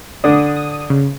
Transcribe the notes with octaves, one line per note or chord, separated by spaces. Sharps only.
D3 D4 D#6
D#6
C#3